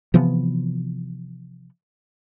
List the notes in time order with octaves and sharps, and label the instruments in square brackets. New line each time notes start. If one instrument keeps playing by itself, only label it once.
[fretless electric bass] C3 E3 F3 B3